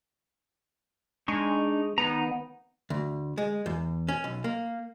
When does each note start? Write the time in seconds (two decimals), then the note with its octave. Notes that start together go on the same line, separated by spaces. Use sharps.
1.28 G#3 D4 D#4 C#6
1.98 D#3 B3 D#4 A#5
2.90 D2
3.38 G#3
3.66 E2
4.08 C#4
4.24 B1
4.44 A#3